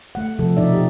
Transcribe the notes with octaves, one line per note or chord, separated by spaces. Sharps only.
A3 F#5
C3 F3 A4
B2 F3 D#4 D5 E5
G4